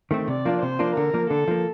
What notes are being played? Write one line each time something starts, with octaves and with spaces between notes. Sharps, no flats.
D#3 A3 C4
C3 D5
F3 A#3 D4 F4
C3 C5
F3 A#3 D4 F4
D3 A#4
F3 A#3
D3 A4
F3 A#3